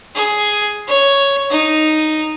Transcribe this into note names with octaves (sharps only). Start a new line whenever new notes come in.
G#4
C#5
D#4